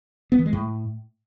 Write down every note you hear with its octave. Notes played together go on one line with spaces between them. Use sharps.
B3
E3
G#3
A2